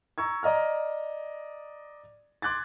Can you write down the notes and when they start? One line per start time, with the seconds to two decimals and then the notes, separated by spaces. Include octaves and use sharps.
0.18 A#5 C#6 E6 G#6
0.43 D5 D#5 A#5 F6
2.42 C6 D6 F#6 G#6 A6